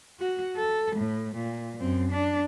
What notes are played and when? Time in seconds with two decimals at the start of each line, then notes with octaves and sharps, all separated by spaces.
0.20 F#4
0.56 A4
0.96 A2
1.36 A#2
1.80 F#2 C4
2.11 D4